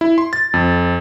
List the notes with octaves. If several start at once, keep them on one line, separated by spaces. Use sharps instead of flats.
E4
C6
A6
F2